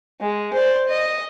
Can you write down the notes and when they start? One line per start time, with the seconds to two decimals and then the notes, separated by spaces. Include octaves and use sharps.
0.22 G#3
0.54 C5 D5
0.88 D#5